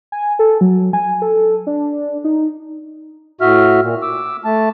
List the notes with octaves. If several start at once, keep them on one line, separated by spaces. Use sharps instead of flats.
G#5
A4
F#3
G#5
A4
D4
D#4
A2 F#4 E5 F6
A#2
D6 E6
A3 A5